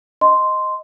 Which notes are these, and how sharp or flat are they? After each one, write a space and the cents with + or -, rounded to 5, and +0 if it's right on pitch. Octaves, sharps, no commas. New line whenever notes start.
D#5 +0 C6 -5